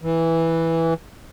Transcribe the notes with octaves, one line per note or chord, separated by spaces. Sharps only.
E3